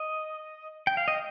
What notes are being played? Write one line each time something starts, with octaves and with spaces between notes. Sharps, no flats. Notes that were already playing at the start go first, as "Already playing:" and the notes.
Already playing: D#5
G5
F5
D#5